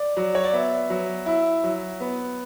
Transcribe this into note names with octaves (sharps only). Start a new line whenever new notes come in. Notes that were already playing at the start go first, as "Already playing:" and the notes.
Already playing: D5
F#3
C#5
D5
B3 E5
F#3
E4
F#3
B3